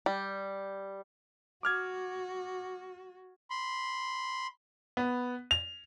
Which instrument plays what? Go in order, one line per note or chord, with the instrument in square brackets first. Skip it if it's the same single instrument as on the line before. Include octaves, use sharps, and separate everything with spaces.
[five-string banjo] G3
[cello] F#4 [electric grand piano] D6 F6 G#6
[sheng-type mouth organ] B5 C6
[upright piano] B3
F7